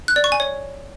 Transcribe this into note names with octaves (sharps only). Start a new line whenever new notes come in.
F#6
D5
C#6
G#5
C#5